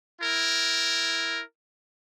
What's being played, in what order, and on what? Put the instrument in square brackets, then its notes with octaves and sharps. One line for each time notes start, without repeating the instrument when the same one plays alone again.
[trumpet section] E4 A#4